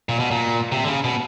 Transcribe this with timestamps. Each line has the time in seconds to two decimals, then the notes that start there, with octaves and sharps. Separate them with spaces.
0.09 A#2
0.20 B2
0.31 A#2
0.72 C3
0.84 D3
0.88 C#3
1.04 B2